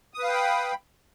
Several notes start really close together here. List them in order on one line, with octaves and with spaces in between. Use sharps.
D#6 B4 F5 G5 B5